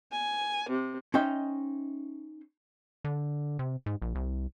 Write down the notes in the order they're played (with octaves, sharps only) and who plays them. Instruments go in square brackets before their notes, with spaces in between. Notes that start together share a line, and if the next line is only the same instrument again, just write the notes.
[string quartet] G#5
C3
[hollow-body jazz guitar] C#4 D#4 C5 D#5 E5 G5
[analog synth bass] D3
C3
G#2
A#1
C2